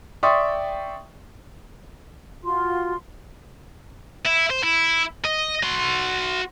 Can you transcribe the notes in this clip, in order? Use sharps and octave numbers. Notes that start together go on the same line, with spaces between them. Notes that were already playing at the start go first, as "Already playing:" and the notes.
D5 E5 G5 C6 C#6 D#6
F4 F#4 C6
E4
C5
E4
D#5
F#4 C6